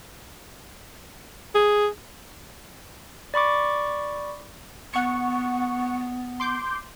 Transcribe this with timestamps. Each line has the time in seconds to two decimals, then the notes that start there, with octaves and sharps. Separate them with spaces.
1.55 G#4
3.34 D5 B5 C#6 D6
4.94 B3 F#5 C#6
6.40 C6 D6 G6